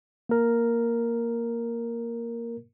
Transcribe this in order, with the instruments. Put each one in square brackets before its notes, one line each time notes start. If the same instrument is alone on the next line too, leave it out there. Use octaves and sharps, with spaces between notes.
[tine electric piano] A#3 A#4